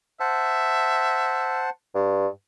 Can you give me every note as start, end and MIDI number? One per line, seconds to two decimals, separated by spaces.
0.20 1.70 72
0.20 1.63 76
0.20 1.70 78
0.20 1.70 81
1.94 2.27 43